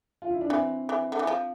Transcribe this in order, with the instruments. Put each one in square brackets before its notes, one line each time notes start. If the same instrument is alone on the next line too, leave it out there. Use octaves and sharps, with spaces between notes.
[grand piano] F4
E4
D4
[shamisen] E3 [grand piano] C4
[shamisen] E3
D3
E3
F3